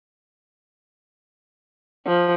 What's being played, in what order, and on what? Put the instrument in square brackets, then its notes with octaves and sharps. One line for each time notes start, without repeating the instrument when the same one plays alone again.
[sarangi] F3